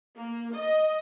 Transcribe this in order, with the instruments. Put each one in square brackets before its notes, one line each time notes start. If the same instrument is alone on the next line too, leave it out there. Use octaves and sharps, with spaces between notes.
[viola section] A#3
D#5